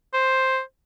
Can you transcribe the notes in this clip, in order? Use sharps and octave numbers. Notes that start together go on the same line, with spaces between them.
C5